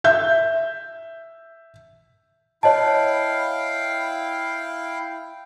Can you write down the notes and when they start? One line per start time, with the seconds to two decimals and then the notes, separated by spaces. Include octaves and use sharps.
0.04 E5 G6
2.63 E4 C#5 D#5 F5 G5 A5